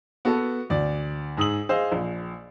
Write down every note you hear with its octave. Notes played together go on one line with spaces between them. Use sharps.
B3 F#4 A4 B4
D2 D5
G#2 G#4 D#6 E6 F#7
G#4 C5 D#5 F5 E6
A#1